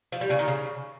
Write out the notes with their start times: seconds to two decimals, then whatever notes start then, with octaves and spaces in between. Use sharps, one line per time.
0.12 F3
0.21 G3
0.30 C#3
0.39 D#3
0.48 C#3